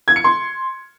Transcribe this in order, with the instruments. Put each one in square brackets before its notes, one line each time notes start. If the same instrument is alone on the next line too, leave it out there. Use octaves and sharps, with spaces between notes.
[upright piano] G#6
C#7
C6